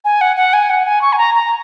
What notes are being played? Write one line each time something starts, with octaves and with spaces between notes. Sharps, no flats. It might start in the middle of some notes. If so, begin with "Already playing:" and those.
G#5
F#5
F#5
G#5
F#5
G#5
C#6
G#5
A#5
A#5